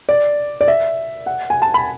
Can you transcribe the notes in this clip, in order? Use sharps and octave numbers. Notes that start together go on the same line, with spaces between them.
D5
D5
E5
F#5
G#5
A5
B5